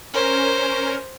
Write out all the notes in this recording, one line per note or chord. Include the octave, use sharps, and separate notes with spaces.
C#4 A#4 C5